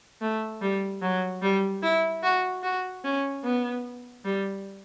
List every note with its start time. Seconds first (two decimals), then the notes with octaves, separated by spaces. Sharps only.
0.21 A3
0.61 G3
1.02 F#3
1.42 G3
1.83 E4
2.23 F#4
2.63 F#4
3.04 C#4
3.44 B3
4.25 G3